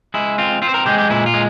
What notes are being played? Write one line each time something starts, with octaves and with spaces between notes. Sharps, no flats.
G#3 E4
C4 F4
C4 F4
C5
A#4
G#3 G4
G4
A#2 E4
F4
G#3